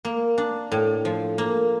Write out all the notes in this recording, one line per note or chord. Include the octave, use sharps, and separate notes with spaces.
A#3
D4
A2
F3
A#3